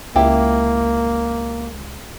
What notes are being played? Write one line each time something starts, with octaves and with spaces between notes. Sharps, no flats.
C#2 A#3 E4 F4 G4